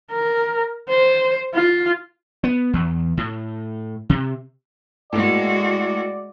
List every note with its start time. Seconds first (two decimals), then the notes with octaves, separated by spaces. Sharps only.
0.12 A#4
0.89 C5
1.54 F4
2.44 B3
2.73 E2
3.17 A2
4.10 C3
5.13 A2 G#3 A#3 F#4 D5